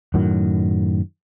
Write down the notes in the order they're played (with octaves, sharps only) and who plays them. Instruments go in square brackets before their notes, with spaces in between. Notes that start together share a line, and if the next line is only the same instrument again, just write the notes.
[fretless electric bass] F#2 A2 D#3 F#3